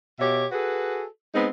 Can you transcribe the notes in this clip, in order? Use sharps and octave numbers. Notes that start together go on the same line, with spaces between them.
B2 G4 C#5 E5
F#4 G#4 A4 B4
G#3 B3 C4 D#4